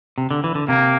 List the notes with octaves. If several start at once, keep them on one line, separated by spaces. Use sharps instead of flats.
C3
D3
E3
D3
C3 A#3